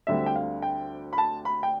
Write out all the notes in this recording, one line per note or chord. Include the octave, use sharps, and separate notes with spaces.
D2 D3 G3 C4 E5
G5
F5
G5
B5
A5
B5
G5